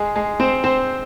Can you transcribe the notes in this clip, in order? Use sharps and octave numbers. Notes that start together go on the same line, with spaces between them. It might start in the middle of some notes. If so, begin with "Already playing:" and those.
Already playing: G#3 G#4
G#3 G#4
C4 C5
C4 C5